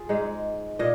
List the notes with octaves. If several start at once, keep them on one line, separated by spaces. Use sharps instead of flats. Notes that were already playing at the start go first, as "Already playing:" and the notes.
Already playing: F4 G#4
G#2 G#3 D#4
A#2 D#5